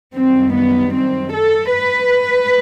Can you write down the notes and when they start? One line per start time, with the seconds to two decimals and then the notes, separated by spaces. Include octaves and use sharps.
0.15 F#2 D#3 G3 C4
0.54 B3
0.94 C4
1.34 A4
1.74 B4